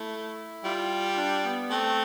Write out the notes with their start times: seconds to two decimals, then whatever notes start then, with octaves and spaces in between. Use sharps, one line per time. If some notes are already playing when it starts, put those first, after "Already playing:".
Already playing: A3 E4
0.64 G3 F4
1.17 D4
1.44 B3
1.70 A3 C4